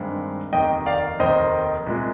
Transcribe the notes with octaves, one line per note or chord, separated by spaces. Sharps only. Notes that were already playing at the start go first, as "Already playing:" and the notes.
Already playing: G2 D#3 G#3 C4
F1 D#2 D#3 D#5 G5
D5 F5
F1 D#2 D#3 C5 D#5
C2 A#2 G#3